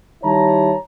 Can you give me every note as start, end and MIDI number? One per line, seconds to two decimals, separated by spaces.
0.24 0.74 51
0.24 0.74 55
0.24 0.74 64
0.24 0.74 73
0.24 0.74 81
0.24 0.74 82